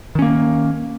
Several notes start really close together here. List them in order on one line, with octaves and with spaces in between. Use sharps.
D#3 C#4 A#3